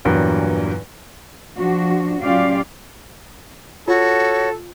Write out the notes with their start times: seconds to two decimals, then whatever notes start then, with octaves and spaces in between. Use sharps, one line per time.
0.05 E2 G2 A#2 F#3
1.56 F3 D4 F#4
2.22 F#3 C#4 F4 G4 D5 F5
3.88 F4 F#4 A4 C#5